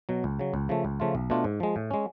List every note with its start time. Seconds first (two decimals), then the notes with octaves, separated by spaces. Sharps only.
0.09 B2 F#3
0.24 C#2
0.39 C#3 F#3
0.54 C#2
0.69 C#3 F3 A3
0.85 C#2
1.00 C#3 F3 A3 F4
1.15 B1
1.30 B2 A3 D4 F4
1.44 G#2
1.60 F3 G#3
1.76 A2
1.91 G#3 C#4